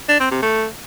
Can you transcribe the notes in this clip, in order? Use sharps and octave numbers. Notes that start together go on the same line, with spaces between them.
D4
C4
C3
A3